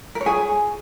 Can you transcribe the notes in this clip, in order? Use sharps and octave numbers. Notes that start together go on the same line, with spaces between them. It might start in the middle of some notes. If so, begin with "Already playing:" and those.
A#4
C#5
G#4